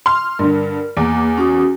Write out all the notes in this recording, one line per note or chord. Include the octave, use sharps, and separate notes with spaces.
C6 F6
G2 D3 A#4
E2 A#3 D6
C#4 F#4 D#6